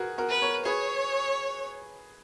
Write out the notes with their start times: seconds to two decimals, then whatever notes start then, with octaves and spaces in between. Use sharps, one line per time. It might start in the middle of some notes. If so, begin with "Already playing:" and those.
Already playing: F#4 G#4 A#4 B4
0.18 F#4 A#4
0.30 B4
0.42 A#4 C#5
0.65 G#4 B4 C#5